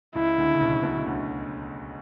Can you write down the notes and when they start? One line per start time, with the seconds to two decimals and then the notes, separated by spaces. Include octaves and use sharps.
0.15 C#2 C#3 E4
0.38 D2 D3
0.54 C#3
0.61 B1 B2
0.83 B1 B2
0.96 C#3
1.06 D2 D3